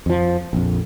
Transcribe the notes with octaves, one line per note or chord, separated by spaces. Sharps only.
F2 F3
A#1 F2